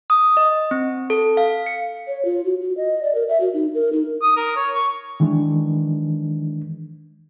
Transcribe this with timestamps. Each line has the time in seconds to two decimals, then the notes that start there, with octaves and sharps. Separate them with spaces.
0.10 D#6
0.37 D#5
0.71 C4
1.10 A4
1.37 F5
1.66 C#7
2.07 C#5
2.25 F4
2.45 F#4
2.61 F#4
2.77 D#5
3.03 D5
3.15 A#4
3.28 E5
3.40 F#4
3.54 D#4
3.74 A#4
3.93 D#4
4.22 D#6
4.37 A#4
4.56 C#5
4.74 C#6
5.20 D#3 E3 G#3 D4